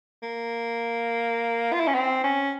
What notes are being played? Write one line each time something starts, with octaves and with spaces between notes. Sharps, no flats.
A#3
F4
E4
C#4
C4
C#4